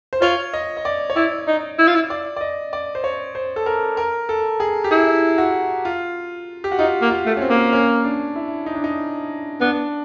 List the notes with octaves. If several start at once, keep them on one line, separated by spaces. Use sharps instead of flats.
C5
F4 C#5
D#5
D#5
D5
C#5
E4 D5
D#4
E4
F4
E4
D5
D5
D#5
D5
C5
C#5
C5
A4
A#4
A#4
A4
G#4
G4
E4 G#4
F#4
F4
G4
F#4
D#4 F4
A#3
F4
A3
C#4
C4
A#3
C#4
D4
E4
D#4
D4
D#4
B3 D4